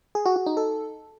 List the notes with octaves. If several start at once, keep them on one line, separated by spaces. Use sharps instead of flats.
G#4
F#4
F#4
D#4
A4